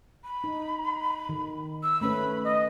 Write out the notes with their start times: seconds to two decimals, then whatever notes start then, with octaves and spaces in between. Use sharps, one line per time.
0.24 B5
0.44 D#4
1.29 D#3
1.83 E6
2.01 A3 C#4 B4 B5
2.44 D#5